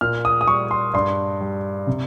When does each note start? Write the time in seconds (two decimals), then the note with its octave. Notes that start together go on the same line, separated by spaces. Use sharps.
0.01 A#2 F6
0.25 D#6
0.41 D#6
0.48 G3 C#6
0.71 C6
0.93 G2 C6
1.41 G3
1.87 C3